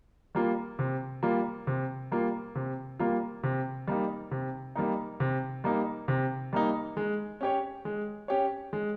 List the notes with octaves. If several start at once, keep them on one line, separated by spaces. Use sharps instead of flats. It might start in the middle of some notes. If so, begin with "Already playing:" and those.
G3 A#3 F4
C3
G3 A#3 F4
C3
G3 A#3 F4
C3
G3 A#3 F4
C3
G3 A#3 D#4
C3
G3 A#3 D#4
C3
G3 A#3 D#4
C3
G3 A#3 D#4
G#3
C#4 G4 C#5
G#3
C#4 G4 C#5
G#3